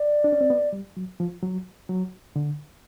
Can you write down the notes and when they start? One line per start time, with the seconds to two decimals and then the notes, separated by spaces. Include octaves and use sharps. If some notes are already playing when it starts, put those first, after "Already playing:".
Already playing: D5
0.24 D4
0.32 C#4
0.41 C4
0.50 B3
0.73 G3
0.97 F#3
1.20 F3
1.43 F#3
1.89 F#3
2.36 D3